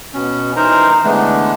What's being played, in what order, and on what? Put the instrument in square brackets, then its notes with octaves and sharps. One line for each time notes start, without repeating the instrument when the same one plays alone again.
[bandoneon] B2 C#4
E3 D#4 A#4 C5 A#5
D3 E3 G#3 A3 B3 D4